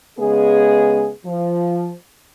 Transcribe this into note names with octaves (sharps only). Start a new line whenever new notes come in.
C#3 G#3 B3 G#4
F3